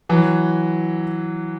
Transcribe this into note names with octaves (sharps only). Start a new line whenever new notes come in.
E3 F#3